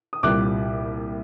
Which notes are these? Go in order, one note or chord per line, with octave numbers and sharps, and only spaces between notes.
D#6
C2 A#2 G3 A#3 D6 F#6